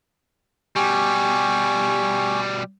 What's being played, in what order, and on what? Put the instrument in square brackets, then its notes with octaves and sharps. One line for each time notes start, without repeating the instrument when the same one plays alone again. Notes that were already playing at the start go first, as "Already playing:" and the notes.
[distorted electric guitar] B2 G3 [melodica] G4 G#5 C#6